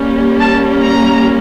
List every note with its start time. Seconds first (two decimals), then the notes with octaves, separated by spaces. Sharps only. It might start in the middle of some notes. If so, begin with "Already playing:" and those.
Already playing: G3 A#3 C#4
0.39 A5
0.81 A#5